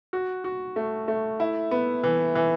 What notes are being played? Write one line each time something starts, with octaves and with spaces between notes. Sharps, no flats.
F#4
F#4
A3
A3
E4
B3
E3
E3